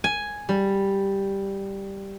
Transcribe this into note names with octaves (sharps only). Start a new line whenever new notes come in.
G#5
G3